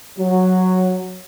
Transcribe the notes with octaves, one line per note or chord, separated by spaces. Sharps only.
F#3